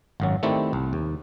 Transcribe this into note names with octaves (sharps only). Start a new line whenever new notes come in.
G#1 F#2 F#3
D#3 A3 C4 E4 G4 D5
C2
D#2